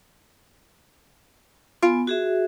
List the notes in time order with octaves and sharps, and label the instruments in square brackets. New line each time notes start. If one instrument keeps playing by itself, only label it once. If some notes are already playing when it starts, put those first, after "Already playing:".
[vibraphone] B3 G#5 [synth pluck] F4
[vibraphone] F#4 G#4 E5